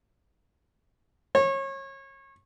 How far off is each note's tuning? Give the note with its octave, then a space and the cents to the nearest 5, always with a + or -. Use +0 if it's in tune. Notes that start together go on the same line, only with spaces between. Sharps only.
C#5 -30